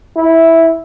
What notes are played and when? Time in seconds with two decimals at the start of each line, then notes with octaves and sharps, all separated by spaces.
0.16 E4